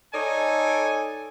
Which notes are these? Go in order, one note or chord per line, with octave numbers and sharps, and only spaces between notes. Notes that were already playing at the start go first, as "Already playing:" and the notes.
D#4 A4 C#5 D5 G#5